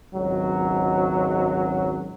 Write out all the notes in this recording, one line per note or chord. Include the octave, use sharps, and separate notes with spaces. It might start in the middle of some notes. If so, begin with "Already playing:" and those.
G#1 C#2 F#3